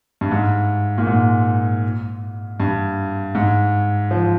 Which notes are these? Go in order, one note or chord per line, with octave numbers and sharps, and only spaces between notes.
G2
G#2
A#2
G#2
G2
G#2
F3